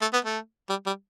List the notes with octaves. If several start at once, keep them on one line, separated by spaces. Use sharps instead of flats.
A3
B3
A3
G3
G3